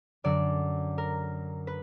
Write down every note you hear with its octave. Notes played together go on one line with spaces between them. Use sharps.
F#2 D3 F#3 D5
A#4
B4